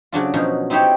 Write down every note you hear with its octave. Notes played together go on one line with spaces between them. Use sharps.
C#3 F#3 D4 F4
B2 F3 F#3 C#4 D#4
C4 D#4 E4 G4 C5 C#5